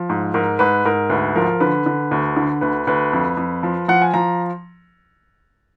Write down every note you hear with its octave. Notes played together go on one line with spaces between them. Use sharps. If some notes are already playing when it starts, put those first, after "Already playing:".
Already playing: F3
G#2
G#2 A#4
G#2 B4
G#2 A#4
D2 B4
F3 A#4
D3 B4
D3
D2
D3
D2 B4
D2 B4
F2
F2
F3
F3 F#5
G#5
F3 A#5